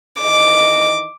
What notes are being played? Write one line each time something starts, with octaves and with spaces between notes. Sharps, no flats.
D#3 E3 D#5 D6